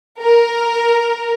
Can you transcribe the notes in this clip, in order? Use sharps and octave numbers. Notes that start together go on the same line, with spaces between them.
A#4